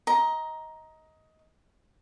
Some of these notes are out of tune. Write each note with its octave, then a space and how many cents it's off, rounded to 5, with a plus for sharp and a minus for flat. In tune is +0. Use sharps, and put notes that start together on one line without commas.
D#5 +20 A#5 +10